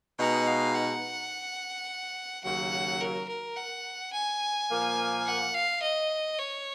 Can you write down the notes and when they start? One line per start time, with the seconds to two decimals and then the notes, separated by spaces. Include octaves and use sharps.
0.19 B2 G#3 D#4 F#5
0.48 F5
0.75 F#5
2.44 D#2 C#3 F#3 F#5
3.01 A#4
3.29 A#4
3.56 F#5
4.13 G#5
4.70 A#2 F3 A#3
5.26 F#5
5.54 F5
5.82 D#5
6.39 C#5